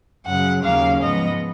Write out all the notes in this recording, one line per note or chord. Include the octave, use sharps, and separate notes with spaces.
F#2 C#3 F#3 F#5
D#2 C#3 F#3 A#3 C#4 F5
G#2 F3 B3 D#5